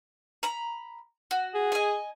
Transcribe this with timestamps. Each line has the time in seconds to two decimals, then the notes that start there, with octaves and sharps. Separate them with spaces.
0.43 A#5 B5
1.31 F#4
1.55 G#4
1.72 D#5 G#5